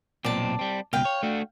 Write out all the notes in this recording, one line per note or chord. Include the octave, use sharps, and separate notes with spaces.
B1 A#2 C4 D5 A5
G3 C4
C#2 B2 F5 G5
C#5
A3 D4 F#4